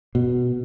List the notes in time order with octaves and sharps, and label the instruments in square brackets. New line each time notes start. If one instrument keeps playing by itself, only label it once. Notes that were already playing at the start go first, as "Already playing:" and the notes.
[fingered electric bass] B2